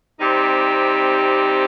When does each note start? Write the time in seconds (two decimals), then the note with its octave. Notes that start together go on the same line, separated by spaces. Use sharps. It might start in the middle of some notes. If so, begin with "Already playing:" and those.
0.20 C3 G3 C4 D#4 G4